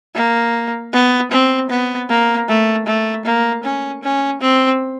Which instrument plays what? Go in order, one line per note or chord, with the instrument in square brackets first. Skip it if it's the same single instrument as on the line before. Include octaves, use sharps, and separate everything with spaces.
[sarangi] A#3
B3
C4
B3
A#3
A3
A3
A#3
C#4
C#4
C4